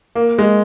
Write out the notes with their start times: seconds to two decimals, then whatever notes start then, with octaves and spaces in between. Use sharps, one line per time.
0.15 A#3
0.38 G#3